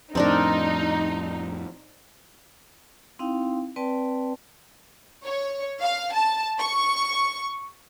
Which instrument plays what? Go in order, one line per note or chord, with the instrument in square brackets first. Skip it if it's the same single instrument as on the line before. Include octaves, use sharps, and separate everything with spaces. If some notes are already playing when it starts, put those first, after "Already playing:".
[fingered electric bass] F2 A2 [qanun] C4 D4 A#4 [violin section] D#4
[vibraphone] C4 D#4 E4 F5 G5
C4 B4 D5 G5 A5
[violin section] C#5
F5
A5
C#6